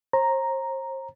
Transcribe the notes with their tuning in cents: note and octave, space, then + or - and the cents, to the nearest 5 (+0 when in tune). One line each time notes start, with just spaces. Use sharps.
C5 +40 A#5 +0